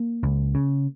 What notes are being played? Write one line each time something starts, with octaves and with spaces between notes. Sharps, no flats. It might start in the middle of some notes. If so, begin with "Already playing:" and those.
Already playing: A#3
C#2
C#3